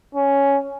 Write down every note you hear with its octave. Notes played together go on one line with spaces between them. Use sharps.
C#4